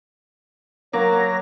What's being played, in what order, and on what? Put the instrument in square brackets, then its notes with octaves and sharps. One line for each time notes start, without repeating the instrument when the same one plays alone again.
[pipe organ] F#3 A#6 [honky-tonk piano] A#3 [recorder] A#5